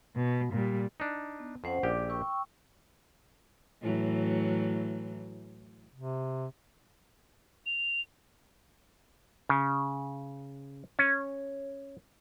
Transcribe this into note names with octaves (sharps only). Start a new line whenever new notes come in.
B2
A#2 G3
D4 D#4
B3
F2 C#4 C5 F#5
A#1 G4 D5 D6
G5 C#6 E6
A2 E3 F#3
C3
F7
C#3
C#4